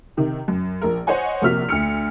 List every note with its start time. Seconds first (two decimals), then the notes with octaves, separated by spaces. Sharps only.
0.17 C3 D#3
0.48 F#2
0.82 A#1 A#4
1.07 C5 C#5 D#5 F#5 G#5
1.42 A#1 C3 A#3 F#4 F6 B6
1.69 D2 F6 C#7